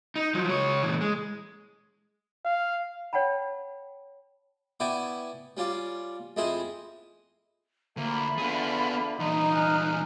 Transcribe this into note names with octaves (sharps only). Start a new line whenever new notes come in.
D#4
F3 F#3
C#2 C#5
A#2 E3
G#3
F5
C#5 F#5 G5 A5 B5
B3 E4 D5 G5 G#5 C#6
G3 C#4 F4 D5
F2 G#3 E4 G#4 C5 D#5
D2 A#3 F4 E5 B5
D3 B3 G#4
E2 A#2 D#4
G#5 F6 F#6